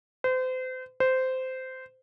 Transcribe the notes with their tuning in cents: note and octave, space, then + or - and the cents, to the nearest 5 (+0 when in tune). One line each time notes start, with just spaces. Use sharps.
C5 -35
C5 -15